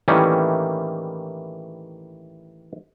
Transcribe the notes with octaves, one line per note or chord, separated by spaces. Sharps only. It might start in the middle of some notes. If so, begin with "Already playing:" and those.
A2 D#3 E3 G3 A#3 C#4